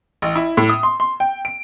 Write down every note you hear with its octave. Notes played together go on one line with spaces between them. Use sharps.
A1
E4
A2
D#6
C6
C6
G5
D7